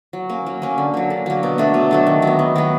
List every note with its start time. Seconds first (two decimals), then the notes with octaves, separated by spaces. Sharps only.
0.13 F#3
0.30 A#3 C#4
0.47 F#3
0.62 A#3 C#4
0.78 D3
0.94 F#3 A#3
1.10 D3
1.26 F#3 A#3
1.43 B2
1.58 F#3 A3 D4
1.74 B2
1.91 F#3 A3 D4
2.07 D#3
2.22 F#3 B3
2.39 D#3
2.56 F#3 B3